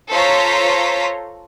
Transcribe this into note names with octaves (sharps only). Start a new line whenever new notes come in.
F4 A4 C5 C#5 A#5 B6